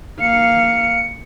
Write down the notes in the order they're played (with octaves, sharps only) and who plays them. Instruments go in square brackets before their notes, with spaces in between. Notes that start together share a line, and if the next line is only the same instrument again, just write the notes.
[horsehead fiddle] A#3 F5 [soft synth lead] C#7